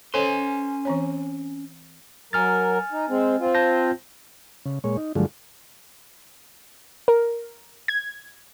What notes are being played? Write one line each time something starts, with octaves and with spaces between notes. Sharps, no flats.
C#4 A4 C5 C#5 G#5 C6
E3 C4 C#5
F#3 A#4 G#5 F6 A6
D#4
G#3 C4
C4 F4
A5 G6 A#6
C#3
A#2 G#3 C#5
D#4
G2 D3 F3 F#3 G#3 A3
A#4
G#6